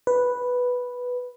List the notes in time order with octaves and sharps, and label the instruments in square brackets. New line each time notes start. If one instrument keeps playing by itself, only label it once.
[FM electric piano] B4